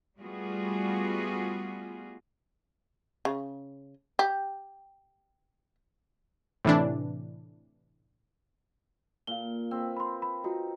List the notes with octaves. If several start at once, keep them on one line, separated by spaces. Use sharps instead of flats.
G3 A3 B3 F4 F#4 G#4
C#3
G4
A2 C3 E3 D4
A#2 F5 G7
C4 B4
B5 C6
B5
D#4 F4 F#4